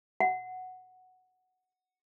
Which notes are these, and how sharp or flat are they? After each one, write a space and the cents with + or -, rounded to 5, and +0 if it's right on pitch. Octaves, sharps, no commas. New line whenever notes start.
F#5 +0